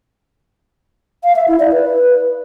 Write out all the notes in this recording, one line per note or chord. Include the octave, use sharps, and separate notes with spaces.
F5
E5
E4
D5
B4